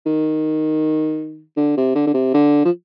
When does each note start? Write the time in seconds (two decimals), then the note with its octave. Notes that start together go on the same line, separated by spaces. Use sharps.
0.06 D#3
1.57 D3
1.77 C3
1.95 D3
2.07 D3
2.14 C3
2.34 D3
2.65 F3